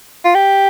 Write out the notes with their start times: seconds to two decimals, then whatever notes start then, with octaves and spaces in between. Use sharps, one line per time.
0.25 F4
0.35 G4